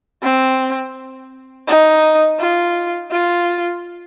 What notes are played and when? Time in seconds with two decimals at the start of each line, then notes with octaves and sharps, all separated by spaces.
0.22 C4
1.67 D#4
2.39 F4
3.11 F4